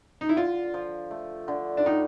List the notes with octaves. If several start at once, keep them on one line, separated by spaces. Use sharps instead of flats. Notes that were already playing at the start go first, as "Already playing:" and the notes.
D#4
E4
D3 F4
F3
A3
D3
D4
A2 D#4